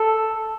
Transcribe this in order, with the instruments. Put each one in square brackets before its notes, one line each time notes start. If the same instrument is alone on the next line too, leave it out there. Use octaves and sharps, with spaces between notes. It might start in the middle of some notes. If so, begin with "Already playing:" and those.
Already playing: [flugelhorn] A4